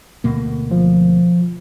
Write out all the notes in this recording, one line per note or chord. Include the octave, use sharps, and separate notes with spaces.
D2 B2 A#3
F3